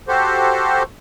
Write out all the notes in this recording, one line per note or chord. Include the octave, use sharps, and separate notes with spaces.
F#4 G4 A4 C5